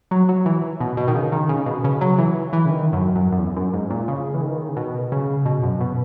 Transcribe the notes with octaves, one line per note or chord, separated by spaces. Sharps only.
F#3
F#3
E3
B2
B2
D#3
C#3
D#3
C#3
B2
C#3
F#3
E3
E3
C#3
D#3
F#2
F#2
F#2
E2
F#2
G#2
A#2
C#3
E3
D#3
C#3
B2
C#3
B2
F#2
B2